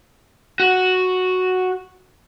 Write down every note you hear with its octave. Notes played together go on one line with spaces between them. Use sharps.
F#4